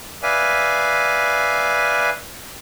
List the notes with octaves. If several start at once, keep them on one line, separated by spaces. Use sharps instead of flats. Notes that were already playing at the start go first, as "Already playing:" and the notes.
B4 D5 E5 F5 G#5